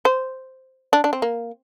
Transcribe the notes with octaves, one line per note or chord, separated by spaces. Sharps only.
C5
D4
D4
C4
A#3